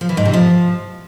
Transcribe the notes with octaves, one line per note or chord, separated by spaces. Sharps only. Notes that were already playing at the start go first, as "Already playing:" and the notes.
F3
E3
G#2
C3
F3